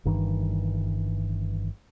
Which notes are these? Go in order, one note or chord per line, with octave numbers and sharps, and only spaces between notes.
G1 G2 D#3 E3